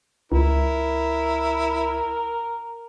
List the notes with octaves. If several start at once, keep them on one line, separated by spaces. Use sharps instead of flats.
C#2 E4 A#4